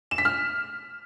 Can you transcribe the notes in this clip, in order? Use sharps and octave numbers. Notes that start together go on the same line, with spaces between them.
E7
B6
F6